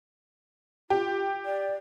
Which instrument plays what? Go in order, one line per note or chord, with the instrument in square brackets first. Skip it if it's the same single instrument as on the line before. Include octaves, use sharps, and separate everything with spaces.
[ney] F4 [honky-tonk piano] G4
[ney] D5